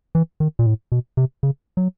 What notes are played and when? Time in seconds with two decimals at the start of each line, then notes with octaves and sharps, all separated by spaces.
0.15 E3
0.40 D#3
0.59 A#2
0.66 A2
0.92 B2
1.17 C3
1.43 C#3
1.77 F#3